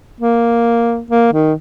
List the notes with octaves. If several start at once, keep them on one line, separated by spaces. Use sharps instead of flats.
A#3
A#3
D#3